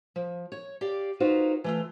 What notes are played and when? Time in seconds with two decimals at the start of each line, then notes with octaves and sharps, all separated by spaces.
0.16 F3
0.52 C#5
0.81 G4 D5 F5
1.20 A#3 D#4 F4 F#4 B4 C5
1.64 E3 A3 F4